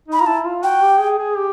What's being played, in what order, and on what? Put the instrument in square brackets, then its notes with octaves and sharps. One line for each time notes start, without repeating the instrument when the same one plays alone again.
[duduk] D#4 [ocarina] B5
[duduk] F4 [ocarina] A#5
[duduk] E4 [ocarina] A5
[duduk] F4
[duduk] F#4 [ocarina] G5
[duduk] G4
G#4
G#4
G4